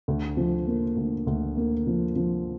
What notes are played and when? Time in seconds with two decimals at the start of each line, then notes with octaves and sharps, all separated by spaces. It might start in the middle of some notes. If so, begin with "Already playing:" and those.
0.08 D2
0.37 F3
0.67 A#3
0.96 D2
1.27 D2
1.57 A#3
1.87 F3
2.16 F3